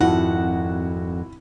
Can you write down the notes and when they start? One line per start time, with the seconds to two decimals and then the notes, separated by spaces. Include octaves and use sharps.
0.01 G#1 F2 E4 F#4 F#5